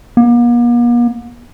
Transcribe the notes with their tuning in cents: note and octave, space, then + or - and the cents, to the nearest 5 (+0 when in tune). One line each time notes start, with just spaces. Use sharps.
A#3 +45